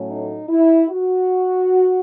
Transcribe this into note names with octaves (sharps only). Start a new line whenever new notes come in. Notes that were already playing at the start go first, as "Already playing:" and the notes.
Already playing: A2 F#3 A3 C#4
D#4
E4
F#4